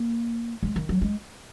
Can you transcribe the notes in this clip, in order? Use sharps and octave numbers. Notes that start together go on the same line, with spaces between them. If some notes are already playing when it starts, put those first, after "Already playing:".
Already playing: A#3
G#3
D#3
F#3
G#3